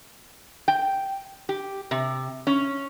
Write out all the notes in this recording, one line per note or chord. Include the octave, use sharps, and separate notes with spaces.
G5
G4
C3
C#4